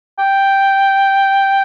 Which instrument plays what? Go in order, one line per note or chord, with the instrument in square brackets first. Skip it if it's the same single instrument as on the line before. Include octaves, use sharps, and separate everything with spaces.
[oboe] G5